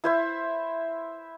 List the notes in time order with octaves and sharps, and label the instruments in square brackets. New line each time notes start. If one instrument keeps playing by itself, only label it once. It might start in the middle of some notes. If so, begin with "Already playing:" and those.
[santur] E4 C5 E5